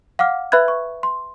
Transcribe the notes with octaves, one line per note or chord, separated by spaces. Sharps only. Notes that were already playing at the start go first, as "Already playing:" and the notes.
F5 F#5 D6 F6
B4 E5 B5 F#6 G#6
C#6
C6